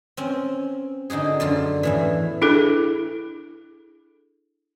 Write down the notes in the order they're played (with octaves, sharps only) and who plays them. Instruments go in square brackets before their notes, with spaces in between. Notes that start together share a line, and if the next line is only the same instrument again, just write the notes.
[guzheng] C4 C#4
D3 D#4 F#4 G#4
F#2 D3 F4
E2 A2 E3
[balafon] D4 E4 G#4 A4